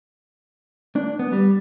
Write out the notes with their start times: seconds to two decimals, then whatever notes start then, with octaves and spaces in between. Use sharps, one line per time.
0.96 D4
1.19 B3
1.33 G3